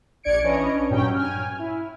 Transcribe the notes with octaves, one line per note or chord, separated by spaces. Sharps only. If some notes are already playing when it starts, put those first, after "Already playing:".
A#1 D4 D5 G#6 C#7 D7
E3 C#4 D4 B4 C#5 D#5
G2 A#2 F#3 C#4 G5
G#5 F6
E4